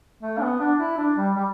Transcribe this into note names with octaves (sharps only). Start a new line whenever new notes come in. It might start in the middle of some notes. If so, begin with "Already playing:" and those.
A3
D4
B3
D4
E4
D4
G3
G3